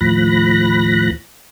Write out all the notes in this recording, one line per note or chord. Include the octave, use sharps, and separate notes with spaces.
D#2 A2 F3 B5 F#6 A#6